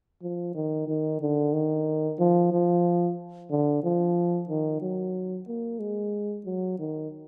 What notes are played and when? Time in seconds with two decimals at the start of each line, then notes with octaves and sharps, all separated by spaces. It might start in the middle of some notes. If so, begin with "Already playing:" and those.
0.22 F3
0.55 D#3
0.88 D#3
1.21 D3
1.53 D#3
2.19 F3
2.52 F3
3.51 D3
3.84 F3
4.49 D#3
4.81 F#3
5.48 A#3
5.80 G#3
6.45 F#3
6.79 D#3